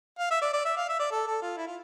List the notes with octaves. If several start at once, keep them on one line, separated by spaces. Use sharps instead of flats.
F5
E5
D5
D5
E5
F5
E5
D5
A4
A4
F4
E4
F4